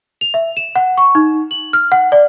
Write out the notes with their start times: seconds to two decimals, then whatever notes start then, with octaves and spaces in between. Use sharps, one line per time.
0.21 F7
0.34 E5
0.57 E7
0.76 F#5
0.97 C#6
1.15 D#4
1.51 F#7
1.73 F6
1.92 F#5
2.12 D5